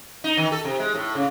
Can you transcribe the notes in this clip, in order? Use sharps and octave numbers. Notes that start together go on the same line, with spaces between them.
D#4
D#3
A4
C3
G#3
A2
C#3